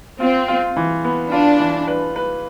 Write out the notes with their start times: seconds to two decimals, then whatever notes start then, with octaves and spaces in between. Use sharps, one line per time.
0.20 C4 F4
0.48 F4
0.77 E3
1.04 B3
1.32 D4 F4
1.60 E3
1.88 B4
2.16 B4